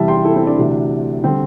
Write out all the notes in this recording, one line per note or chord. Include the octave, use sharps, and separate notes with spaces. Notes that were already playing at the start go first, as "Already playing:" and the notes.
Already playing: E2 C3 E3 G3 E5 A5
G5 C6
E4 A4
C4 E4
D4
D2 C3 E3
D3 G3 C4